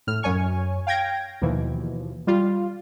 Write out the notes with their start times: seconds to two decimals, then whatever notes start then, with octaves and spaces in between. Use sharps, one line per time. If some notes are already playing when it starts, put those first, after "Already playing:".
0.07 A2 F6
0.23 F#2 C#5 G#5 C#6
0.87 F5 G5 G#6 A#6 D7
1.42 D#2 B2 E3 F3
2.27 G3 F4